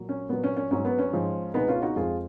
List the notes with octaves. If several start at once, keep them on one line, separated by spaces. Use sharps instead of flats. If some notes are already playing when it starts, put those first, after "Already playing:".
Already playing: A#2 F#3
C#4
A#2 F#3 B3
C#4
C#4
G#2 F#3 C#4
B3
C#4
G#2 F3 G#3
C#2 B2 G#3 B3 D#4
C#4 F4
D#4 F#4
F2 F3 G#3 F4 G#4